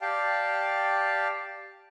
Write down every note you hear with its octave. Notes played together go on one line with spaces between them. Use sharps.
G4 D5 F5 G5 A5